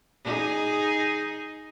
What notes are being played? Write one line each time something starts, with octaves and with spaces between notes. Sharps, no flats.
D#4 G#4